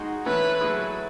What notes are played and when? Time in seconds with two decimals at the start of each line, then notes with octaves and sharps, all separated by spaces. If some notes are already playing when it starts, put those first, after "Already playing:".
Already playing: G#3 D#4 F#4
0.26 E3 A3 C#4 B4
0.61 F#3 A3 E4 G#4